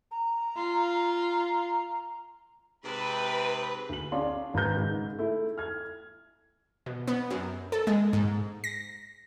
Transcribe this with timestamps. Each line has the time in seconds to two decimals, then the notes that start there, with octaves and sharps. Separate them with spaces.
0.11 A#5
0.57 F4
2.84 G#2 C3 B4
3.89 D2 F#7
4.12 C#4 D4 G#4 F5 C6
4.54 G#1 B4 A#5 G6
4.77 G#2 C#3
5.19 A3 E4
5.58 F6 G#6
6.86 B2
7.07 B3
7.30 F#2
7.72 A4
7.87 G#3
8.13 G#2
8.64 A#6